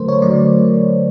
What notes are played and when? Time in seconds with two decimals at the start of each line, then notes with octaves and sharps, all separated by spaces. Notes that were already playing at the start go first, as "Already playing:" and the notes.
Already playing: D3 F#3 A3 A#4 C5
0.08 C#5
0.22 D3 F#3 A3 D5